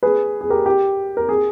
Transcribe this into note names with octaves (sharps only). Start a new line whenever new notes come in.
G#4 B4
G#4
G4 A#4
G4
A#4
G#4